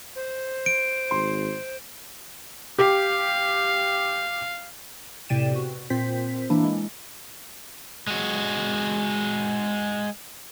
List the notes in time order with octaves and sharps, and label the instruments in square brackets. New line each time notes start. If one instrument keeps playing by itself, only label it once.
[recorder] C5
[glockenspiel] D7
[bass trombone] G#1 [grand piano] C6
[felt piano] G4 [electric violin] F5
[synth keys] A2 C3 D5 G5 D#7 E7
B2 F#4
A#2 C4 C5 B6
E3 A#3 D4 E4
G#3
[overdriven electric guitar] G#3 F#4